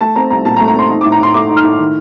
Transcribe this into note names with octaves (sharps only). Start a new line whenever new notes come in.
A3 A5
C4 A#5
C2 A#5
A#2 A5
A#5
A3
A#5
C4 C6
D#4
A2 D6
A#5
A2 C6
A3 D6
D#4
F6
A2
D#3